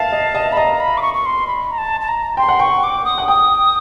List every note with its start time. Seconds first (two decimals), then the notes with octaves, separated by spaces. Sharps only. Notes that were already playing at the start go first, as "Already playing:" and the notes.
Already playing: E5 F5 A5
0.12 D#5
0.35 D#5
0.45 E5
0.52 B5
0.57 D#5 A#5
0.80 B5
0.97 D6
1.02 C#6
1.14 C#6
1.25 C6
1.47 B5
1.71 A#5
1.78 A5
2.01 A5
2.08 A#5
2.37 G5 C6
2.49 F#5
2.59 G5 C#6
2.83 D6
3.05 D#6
3.18 F#5
3.28 G5 D#6